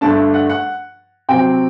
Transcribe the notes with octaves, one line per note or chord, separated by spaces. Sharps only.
G2 D3 A3 D4 A5
F#5
F#5
C3 F#3 C4 G5